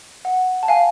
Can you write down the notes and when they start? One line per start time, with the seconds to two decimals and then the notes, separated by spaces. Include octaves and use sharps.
0.25 F#5
0.63 A5
0.68 F5 G#5